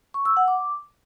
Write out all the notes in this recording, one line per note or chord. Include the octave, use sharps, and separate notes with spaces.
C#6
E6
F#5
D6